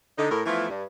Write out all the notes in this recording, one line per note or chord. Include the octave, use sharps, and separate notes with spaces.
D3 D#4
A2 A#4
E3 F3 A3 B3 E4 F4
G2